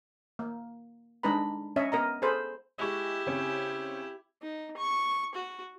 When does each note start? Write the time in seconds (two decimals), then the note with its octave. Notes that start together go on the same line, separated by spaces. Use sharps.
0.39 A#3
1.23 G#3 D4 D#4 B4 A#5 B5
1.76 C#4 C#5 D#5 E5
1.92 B3 A#4 D#5 A#5
2.22 G#4 A4 C5 B5
2.79 G#3 E4 G4 C#6
3.26 C#3 C4 C#4
4.42 D#4
4.77 C#6
5.35 F#4